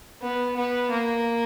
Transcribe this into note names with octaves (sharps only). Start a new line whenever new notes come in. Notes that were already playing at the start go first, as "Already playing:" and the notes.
B3
B3
A#3